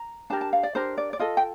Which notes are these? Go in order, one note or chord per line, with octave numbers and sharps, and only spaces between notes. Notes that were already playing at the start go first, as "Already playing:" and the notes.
Already playing: A#5
D4 G4 A#4 A5
A5
F5
D5
D4 G4 A#4 C5
D5
D5
F4 A4 D#5
G5